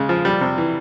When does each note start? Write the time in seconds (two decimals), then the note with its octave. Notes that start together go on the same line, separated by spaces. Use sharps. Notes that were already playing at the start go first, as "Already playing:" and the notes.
Already playing: C#3 G#3
0.09 F3
0.25 G3
0.41 C3
0.58 E3